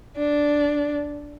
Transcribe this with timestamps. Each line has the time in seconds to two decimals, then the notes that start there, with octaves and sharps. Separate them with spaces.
0.17 D4